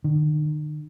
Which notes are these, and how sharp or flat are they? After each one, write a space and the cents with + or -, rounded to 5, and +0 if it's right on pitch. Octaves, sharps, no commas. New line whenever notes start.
D#3 -45